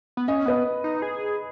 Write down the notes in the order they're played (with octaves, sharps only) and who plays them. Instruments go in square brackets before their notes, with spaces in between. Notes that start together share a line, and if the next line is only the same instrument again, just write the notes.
[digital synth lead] B3
[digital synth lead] C#4 [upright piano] D#5
[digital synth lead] B3 [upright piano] B4 D#5
[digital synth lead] D#4
G#4